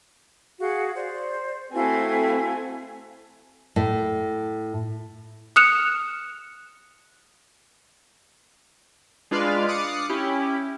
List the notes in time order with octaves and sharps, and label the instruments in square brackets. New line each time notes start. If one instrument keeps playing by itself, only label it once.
[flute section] F#4 G#4 F5
C5 D5
[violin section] A3 C4 G#5 [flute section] E4 F#4 F5
[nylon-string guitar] A2
[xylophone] D#6 F6 F#6 C#7 E7 F7
[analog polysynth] G#3 D4 F4 B4 D5 F5
D6 D#6 F#6 A6 C7 C#7
C#4 E4 G4